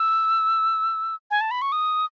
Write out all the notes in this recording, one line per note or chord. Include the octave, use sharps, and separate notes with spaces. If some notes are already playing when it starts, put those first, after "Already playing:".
Already playing: E6
G#5
A5
B5
C#6
D#6